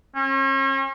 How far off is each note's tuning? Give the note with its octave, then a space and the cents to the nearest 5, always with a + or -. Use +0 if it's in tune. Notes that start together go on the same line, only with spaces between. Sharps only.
C#4 -40